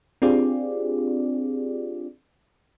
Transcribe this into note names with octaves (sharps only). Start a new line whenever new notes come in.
C4 D4 F4 G4 G#4 D5